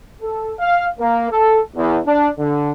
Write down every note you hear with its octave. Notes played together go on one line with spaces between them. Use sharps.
A4
F5
A#3
A4
E2
D4
D3